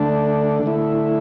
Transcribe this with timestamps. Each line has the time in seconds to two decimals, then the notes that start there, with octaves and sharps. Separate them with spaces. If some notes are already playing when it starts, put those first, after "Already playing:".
Already playing: D3 A3 D4
0.63 D3 A3 E4